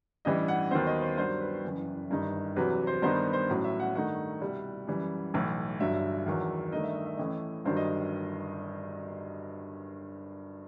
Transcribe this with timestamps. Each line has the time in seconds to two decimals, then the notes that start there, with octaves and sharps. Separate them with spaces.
0.25 A1 G2 E3 G3 D#5
0.48 F#5
0.71 D#2 D#3 F#3 B3 C5
0.87 D#5
1.02 C5
1.18 G2 D#3 F#3 C5
1.41 B4
1.64 F#1 F#2 E3
2.10 G1 G2 D#3 G3 D#4
2.56 E2 C3 F#3 B4
2.87 C5
3.02 G2 D#3 G3 B3 D#4 C5
3.33 C5
3.49 A1 A2 F#3
3.64 E5
3.80 F#5
3.95 G2 D#3 A3 D#4 F#5
4.42 C2 B2 G3
4.87 F#2 E3 G3
5.34 B1 A2 E3
5.80 G1 G2 F#3 E5
6.26 E2 D#3 F#3
6.72 G2 D#3 A3 D#4 D#5
6.84 E5
6.95 D#5
7.06 E5
7.17 A1 A2 E3 A3 D#5
7.65 G1 G2 D#3 F#3 C5
7.77 D#5